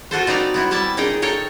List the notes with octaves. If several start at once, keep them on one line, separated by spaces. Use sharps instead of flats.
F4 F#4 A4 C5
A#2 C4 D#4 B4 D5 A#5
B3 C4 E4
G3 E4 E5 A5
A#2 D#4 G#4 D#5 G5
A4 A#4 C#5 G5